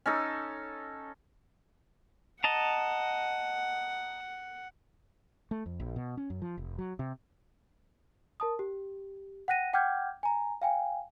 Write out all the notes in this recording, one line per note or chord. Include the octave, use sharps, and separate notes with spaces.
C#4 D#4 A4
D#5 F#5 A5 A#5
A3
F2
A#1
B2
C#4
F#2
F3
F1
F#3
C3
A#4 A5 D#6
G4
F#5 G5 F#6 A#6 D#7
F#5 G5 D6 F6 G6 G#6
G#5 A#5
F5 G5 G#5